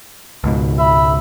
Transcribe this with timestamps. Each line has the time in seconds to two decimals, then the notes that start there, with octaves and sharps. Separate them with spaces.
0.44 C#2 G#2 B2
0.80 E5 B5